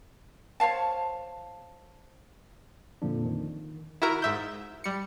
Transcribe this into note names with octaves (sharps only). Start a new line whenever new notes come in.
C5 C#5 F5 A5
F2 A#2 D3 F3 A#3 D4
D#3
E4 F#4 A#4 A#5
G#2 E5 G6
G3 C#7